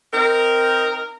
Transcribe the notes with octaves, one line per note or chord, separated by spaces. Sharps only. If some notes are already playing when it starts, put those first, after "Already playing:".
C4 D#4 A#4